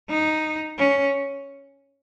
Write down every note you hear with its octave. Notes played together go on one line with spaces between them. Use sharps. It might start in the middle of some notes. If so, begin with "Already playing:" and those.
D#4
C#4